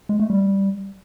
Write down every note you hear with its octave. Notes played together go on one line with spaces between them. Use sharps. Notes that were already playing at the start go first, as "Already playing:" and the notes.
G#3
A3
G3